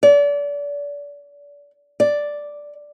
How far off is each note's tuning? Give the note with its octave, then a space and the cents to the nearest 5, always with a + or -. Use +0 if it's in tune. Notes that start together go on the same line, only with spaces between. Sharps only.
D5 -35
D5 +0